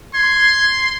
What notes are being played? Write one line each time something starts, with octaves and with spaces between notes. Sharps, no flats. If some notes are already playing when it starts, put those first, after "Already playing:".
C6 G#6